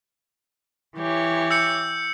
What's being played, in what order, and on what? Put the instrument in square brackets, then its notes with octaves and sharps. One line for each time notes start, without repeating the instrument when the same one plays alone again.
[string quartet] E3 G4 C#5
[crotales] E6 G6 C#7